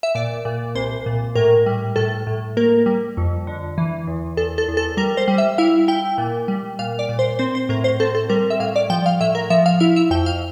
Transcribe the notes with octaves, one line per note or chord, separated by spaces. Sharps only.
E5
A#2 D5
A#2
C2 C5
A#2
A2 A#4
G3
A2 A4
A2
A#3 A#4
G3
F2
D3
E3
E2
E2 A4
A4
E2
A4
G3 A#4
C5
G3
E5
E4 F5
E4 G5
A#2
G3
A#2 F5
D5
A#2
C5
C4 C5
C5
A2 A#4
C5
C4 A4
A4
G3 A#4
E5
A2 F5
D5
F3 G5
F5
A2 E5
A#4
F3 E5
F5
E4 F5
E5
F2 G5
F5